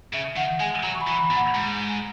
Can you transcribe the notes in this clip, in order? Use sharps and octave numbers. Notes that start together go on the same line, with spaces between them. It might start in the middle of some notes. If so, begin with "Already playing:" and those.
C#3 E5
D#3 F#5
G#3 G#5
F#3 A#5
C#6
B5
E3
B5
A#2
F#5
G#2 A#5
G#5